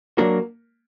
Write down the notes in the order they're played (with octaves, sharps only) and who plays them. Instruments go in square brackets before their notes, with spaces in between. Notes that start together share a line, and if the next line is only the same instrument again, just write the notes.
[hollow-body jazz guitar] F#3 D4 F#4 A#4 [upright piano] A#3